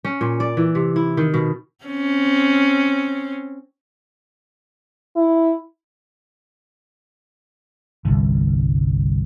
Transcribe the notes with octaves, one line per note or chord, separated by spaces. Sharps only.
C#4
A#2
D5
E3
C3
E4
D#3
B2
C4 C#4
E4
G1 C2